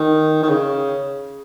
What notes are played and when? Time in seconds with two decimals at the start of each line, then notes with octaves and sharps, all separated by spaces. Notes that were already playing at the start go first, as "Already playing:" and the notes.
Already playing: D#3
0.43 D#3
0.49 C#3